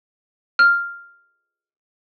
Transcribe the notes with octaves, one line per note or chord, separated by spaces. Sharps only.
F6